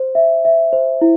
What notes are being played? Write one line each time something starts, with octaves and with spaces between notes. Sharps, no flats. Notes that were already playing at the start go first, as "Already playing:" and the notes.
Already playing: C5
E5
E5
C5
E4